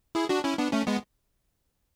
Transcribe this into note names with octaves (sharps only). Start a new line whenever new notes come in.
E4 G#4
D4 F#4
C#4 E4
B3 D4
A3 C#4
G#3 B3